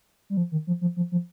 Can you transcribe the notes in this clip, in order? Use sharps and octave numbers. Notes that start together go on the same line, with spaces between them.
G3
F3
D#3
F3
F3
F3
F3